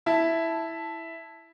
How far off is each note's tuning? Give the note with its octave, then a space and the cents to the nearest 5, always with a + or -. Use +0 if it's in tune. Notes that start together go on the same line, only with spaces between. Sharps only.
E4 +0 A5 +0